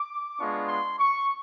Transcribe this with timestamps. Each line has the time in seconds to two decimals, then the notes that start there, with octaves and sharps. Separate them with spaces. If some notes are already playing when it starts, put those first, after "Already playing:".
Already playing: D6
0.38 G#3 B3 D4 F4 C#6
0.69 C6
0.99 C#6